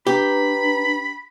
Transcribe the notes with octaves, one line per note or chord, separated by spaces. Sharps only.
D4 G4 B4 A#5 B5